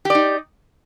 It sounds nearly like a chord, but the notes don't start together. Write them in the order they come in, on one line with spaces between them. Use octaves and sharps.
G4 D5 D#4